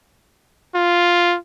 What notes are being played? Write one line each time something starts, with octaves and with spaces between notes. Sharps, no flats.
F4